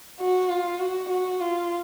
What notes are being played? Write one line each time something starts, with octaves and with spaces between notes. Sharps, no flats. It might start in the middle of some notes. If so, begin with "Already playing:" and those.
F#4
F4
F#4
F#4
F4